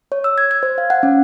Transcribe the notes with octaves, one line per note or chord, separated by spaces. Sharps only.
C#5
E6
G#6
G#6
C5
F5
F#5
C#4